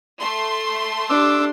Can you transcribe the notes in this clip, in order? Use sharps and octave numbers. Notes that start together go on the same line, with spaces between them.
A3 C6
D4 G4 D6 E6